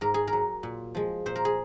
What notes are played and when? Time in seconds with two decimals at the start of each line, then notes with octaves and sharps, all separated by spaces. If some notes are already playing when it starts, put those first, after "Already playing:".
0.01 G#2 A#4
0.14 G#4
0.27 A#4
0.33 F#3
0.63 A#2
0.95 F3 G#3
1.26 A#2 C5
1.35 A#4
1.45 G#4